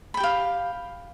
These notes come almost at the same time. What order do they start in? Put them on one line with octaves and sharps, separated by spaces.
B5 G5 G4 F5